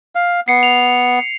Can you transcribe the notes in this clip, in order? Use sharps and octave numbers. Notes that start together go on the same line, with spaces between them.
F5
B3 C7 C#7
F7